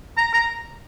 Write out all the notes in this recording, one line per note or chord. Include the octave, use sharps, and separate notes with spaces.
A#5
A#5